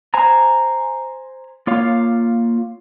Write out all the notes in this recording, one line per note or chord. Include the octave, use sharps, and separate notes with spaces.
C5 G#5 A#5
A#3 F4 C#5 F5